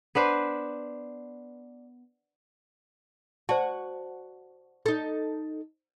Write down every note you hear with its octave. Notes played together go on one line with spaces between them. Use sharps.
B3 D4 B4 C5
F#4 C5 D5 A5
D#4 A4